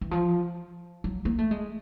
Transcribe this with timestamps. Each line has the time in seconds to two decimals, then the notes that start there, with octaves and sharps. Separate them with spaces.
0.01 E3
0.11 F3
1.04 F#3
1.25 A#3
1.38 A3
1.51 G#3